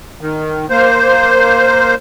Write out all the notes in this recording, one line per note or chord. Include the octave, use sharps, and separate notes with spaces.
D#3
A#3 C5